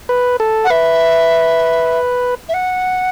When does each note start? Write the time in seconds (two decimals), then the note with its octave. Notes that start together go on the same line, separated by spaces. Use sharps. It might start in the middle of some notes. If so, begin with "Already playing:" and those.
0.09 B4
0.40 A4
0.64 F#5
0.70 B4 E5
2.49 E5
2.54 F#5